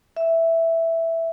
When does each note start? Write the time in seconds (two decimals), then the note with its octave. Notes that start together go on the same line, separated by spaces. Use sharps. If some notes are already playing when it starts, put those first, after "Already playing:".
0.16 E5